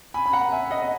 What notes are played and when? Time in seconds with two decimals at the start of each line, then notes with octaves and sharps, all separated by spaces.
0.14 G#5 B5
0.26 B5
0.33 F#5 A#5
0.52 E5 G#5
0.71 D#5 F#5
0.82 D#5